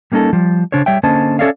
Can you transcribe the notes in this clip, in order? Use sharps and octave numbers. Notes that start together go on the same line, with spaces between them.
G3 A#3 C#4 D#4 A4
F3 G3
C#3 D4 C5 C#5
G3 C#5 E5 G5
D3 A#3 C#4 C5 D#5 A5
C#4 A4 C#5 D5 E5 F5